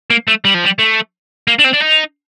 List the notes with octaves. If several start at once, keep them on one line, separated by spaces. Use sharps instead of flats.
A#3
A3
G3
F3
G3
A3
A#3
D4
C4
D4
D#4